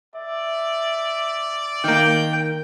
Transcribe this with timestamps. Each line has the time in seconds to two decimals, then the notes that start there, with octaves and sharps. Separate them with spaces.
0.15 D5 E5
1.84 D#3 A#3 G5